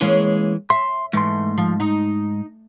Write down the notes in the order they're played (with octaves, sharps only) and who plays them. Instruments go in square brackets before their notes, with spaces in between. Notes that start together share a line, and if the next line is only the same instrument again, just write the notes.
[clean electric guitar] E3 [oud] G#3 A#3 C#4
[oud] E5 [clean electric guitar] C6
[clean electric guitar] G#2 C6 [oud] E3 A3
[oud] F3
D#4